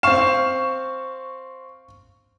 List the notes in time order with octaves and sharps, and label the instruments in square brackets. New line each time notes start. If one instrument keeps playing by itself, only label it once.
[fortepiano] C4 F5 [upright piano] C#6 E7